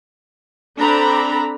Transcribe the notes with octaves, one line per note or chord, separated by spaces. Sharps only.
C4 D4 A4 D5 A#5 B5